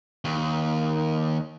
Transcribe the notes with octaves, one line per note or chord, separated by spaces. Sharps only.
D#2